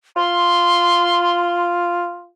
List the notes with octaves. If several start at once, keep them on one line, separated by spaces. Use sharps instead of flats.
F4 C6